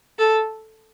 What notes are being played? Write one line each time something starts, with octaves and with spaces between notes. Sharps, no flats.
A4